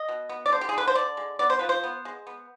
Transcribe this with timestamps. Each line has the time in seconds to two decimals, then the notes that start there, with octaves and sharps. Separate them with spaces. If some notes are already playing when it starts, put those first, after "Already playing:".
Already playing: D#5
0.09 B2
0.29 B3
0.46 D5
0.52 D3 C5
0.61 G4
0.69 G#4
0.73 D3 B4
0.87 C5
0.95 D3 D5
1.17 G#3
1.39 B3 D5
1.50 C5
1.59 F3 B4
1.69 C5
1.84 B3
2.05 G#3
2.27 B3